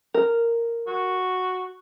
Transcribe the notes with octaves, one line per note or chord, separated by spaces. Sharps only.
A#4
F#4